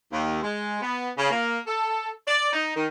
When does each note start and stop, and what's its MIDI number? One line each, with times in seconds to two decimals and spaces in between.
0.12 0.42 39
0.42 0.80 56
0.82 1.10 59
1.17 1.29 49
1.30 1.59 58
1.67 2.09 69
2.27 2.50 74
2.53 2.71 63
2.76 2.86 51